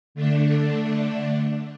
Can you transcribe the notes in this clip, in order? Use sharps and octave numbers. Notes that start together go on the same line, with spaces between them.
D3 A3 D4